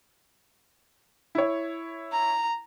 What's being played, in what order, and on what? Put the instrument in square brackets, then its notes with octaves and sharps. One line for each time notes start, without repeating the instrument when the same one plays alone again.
[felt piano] E4 C#5
[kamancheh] A#5